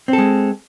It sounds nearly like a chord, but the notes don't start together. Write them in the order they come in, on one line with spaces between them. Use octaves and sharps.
C4 A4 G#3